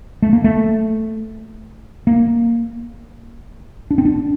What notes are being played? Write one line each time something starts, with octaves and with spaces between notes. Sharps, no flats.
A3
A#3
A3
A#3
D4
C4
D4